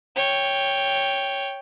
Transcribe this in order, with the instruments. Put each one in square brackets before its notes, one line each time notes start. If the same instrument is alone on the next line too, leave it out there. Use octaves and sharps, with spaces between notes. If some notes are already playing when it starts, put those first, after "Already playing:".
[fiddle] C#5 G5